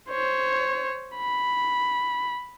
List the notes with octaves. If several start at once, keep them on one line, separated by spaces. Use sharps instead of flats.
C5 C#5
B5